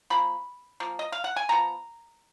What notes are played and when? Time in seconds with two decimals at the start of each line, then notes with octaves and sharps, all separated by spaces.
0.10 F3 A#3 B5
0.80 F3 A#3
0.99 D#5
1.12 F5
1.24 F#5
1.36 G#5
1.49 F3 B3 A#5